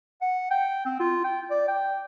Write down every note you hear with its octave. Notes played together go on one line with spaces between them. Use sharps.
F#5
G5
C4
F4
G5
D5
G5